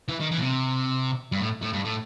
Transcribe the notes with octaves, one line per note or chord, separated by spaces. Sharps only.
E3
D#3
E3
B2
C3
G2
A2
A2
G2
A2